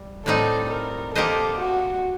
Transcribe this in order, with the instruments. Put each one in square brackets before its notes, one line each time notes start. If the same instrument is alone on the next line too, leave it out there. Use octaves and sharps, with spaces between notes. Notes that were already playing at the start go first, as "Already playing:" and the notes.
Already playing: [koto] G3
[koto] A2 G3 C4 D#4 [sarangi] A4
[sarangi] A#4
[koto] A#3 D#4 G4 C5 D#5 [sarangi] A4
[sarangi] F#4